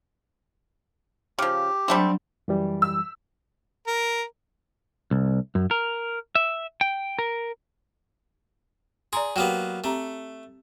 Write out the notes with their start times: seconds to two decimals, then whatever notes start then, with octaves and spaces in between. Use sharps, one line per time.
1.39 C#3 F3 G4
1.88 F#3 G3 A3 C4 D4
2.48 F#2 E3 G3
2.82 E6
3.87 A#4
5.11 C2
5.55 F#2
5.71 A#4
6.35 E5
6.81 G5
7.19 A#4
9.13 G#4 D5 A#5 C6
9.36 F#3 A#3 B3 G4 G5
9.84 A3 C4 G4 A#5